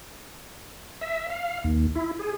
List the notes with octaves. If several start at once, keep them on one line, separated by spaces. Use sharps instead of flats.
E5
F5
D#2
E4
G#4